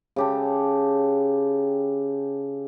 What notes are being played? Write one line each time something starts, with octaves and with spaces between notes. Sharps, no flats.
C#3 G4 A4